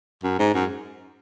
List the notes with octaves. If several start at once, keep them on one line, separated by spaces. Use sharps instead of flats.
F#2
G#2
F#2